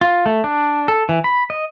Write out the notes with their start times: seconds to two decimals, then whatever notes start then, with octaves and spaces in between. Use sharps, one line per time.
0.01 F4
0.26 A3
0.44 D4
0.88 A4
1.09 E3
1.24 B5
1.50 D#5